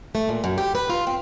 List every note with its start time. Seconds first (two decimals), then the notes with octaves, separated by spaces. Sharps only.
0.15 A3
0.29 A#2
0.44 F#2
0.58 G4
0.75 B4
0.90 F4
1.07 C4